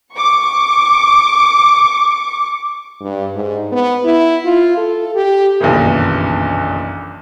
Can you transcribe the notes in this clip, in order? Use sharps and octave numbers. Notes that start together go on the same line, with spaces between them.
C#6 D6
G2
G#2
B3
E4
F4
A4
G4
F#1 B1 G2 A#2 D#3 E3